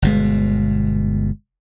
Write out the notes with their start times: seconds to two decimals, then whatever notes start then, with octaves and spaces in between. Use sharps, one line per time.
0.02 G1 B2 G#3